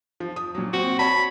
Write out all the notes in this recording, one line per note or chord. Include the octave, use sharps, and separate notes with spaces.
F3
D#6
A#2 F#3
C4 F#4
C#5 A5 B5